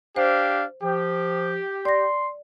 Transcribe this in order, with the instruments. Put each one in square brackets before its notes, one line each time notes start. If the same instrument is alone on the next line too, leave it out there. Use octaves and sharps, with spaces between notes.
[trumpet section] D4 G4 F5 [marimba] C5
[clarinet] F3 [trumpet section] G4
[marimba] D5 A#6 [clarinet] C6